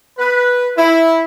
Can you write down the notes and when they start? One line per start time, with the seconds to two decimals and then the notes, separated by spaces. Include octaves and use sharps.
0.18 B4
0.77 E4